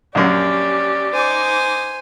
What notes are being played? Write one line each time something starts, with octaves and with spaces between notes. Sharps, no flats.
A#1 F#2 C#4 G4 D5
D#4 C5 G#5 D6